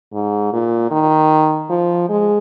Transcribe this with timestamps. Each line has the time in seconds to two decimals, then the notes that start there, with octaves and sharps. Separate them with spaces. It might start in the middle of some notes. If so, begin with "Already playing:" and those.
0.13 G#2
0.53 A#2
0.91 D#3
1.70 F3
2.09 G#3